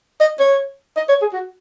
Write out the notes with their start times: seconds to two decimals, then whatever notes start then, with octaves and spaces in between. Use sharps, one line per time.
0.21 D#5
0.40 C#5
0.96 D#5
1.09 C#5
1.22 G#4
1.33 F#4